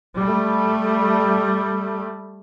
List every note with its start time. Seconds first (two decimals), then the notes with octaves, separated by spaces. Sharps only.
0.19 G3 A3